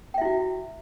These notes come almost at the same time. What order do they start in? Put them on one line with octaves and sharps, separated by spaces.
G5 E5 E4 F#4